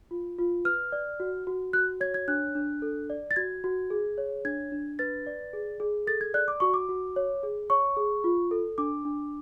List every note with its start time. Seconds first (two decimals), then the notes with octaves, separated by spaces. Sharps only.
0.11 F4
0.38 F4
0.65 B4 F6
0.92 D5
1.20 F#4
1.47 F#4
1.73 F#4 F#6
2.01 C#5 G#6
2.14 G#6
2.28 D4 F#6
2.55 D4
2.82 A4
3.10 D5
3.31 A6
3.36 F#4 G#6
3.64 F#4
3.90 G#4
4.18 C#5
4.45 D4 G#6
4.72 D4
4.99 B4 A6
5.27 D5
5.53 G#4
5.80 G#4
6.07 A4 A6
6.21 G#6
6.34 D5 F#6
6.48 D6
6.60 F#4 C#6
6.74 D6
6.89 F#4
7.16 C#5
7.43 G#4
7.70 C#5 C#6
7.97 G#4
8.24 F4
8.51 A4
8.78 D4 D6
9.05 D4